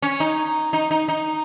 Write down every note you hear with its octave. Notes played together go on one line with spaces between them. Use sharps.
C#4
D#4
D#4
D#4
D#4